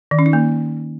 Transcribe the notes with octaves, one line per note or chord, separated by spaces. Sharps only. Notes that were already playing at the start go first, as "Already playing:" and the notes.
D#3
C#4
D#4
A#3